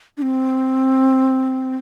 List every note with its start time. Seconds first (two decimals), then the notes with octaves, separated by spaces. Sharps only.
0.17 D4
0.22 C4